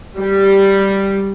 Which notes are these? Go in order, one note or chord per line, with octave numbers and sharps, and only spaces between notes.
G3